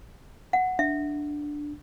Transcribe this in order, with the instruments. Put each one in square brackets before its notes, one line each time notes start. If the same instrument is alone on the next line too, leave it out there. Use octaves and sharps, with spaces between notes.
[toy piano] F#5
[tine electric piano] D4 [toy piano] E5